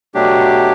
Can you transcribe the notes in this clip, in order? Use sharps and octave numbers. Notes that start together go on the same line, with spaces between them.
B2 F#3 A3 D4 G4